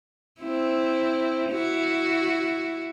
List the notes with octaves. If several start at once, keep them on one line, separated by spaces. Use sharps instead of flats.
C4 E4
E4 F#4